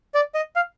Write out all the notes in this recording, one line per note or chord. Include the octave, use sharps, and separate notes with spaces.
D5
D#5
F5